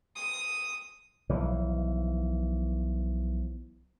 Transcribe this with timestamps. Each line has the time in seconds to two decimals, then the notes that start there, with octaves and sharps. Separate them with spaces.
0.16 D#6
1.29 B1 E3 F3